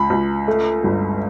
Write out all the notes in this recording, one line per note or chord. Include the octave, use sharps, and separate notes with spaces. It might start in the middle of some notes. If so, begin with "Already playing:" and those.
Already playing: C#2 B5
C#2
A3
G1